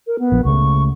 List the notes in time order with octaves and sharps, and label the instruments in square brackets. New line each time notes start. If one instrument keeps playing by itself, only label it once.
[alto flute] A#4
B3
[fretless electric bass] A#1 F3
[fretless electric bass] C#2 C#3 A3 [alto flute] C#6